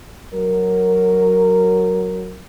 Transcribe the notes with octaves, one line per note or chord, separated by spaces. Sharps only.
F#3 A#4